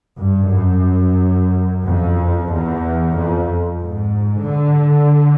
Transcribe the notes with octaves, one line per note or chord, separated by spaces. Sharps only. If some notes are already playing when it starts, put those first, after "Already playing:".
G2
F#2
F2
E2
F2
G#2
D3